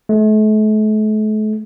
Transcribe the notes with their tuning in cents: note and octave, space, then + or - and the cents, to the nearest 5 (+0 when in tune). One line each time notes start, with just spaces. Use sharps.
A3 -40